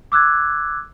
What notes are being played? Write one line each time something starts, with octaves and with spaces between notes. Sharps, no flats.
D6 E6 F#6 G#6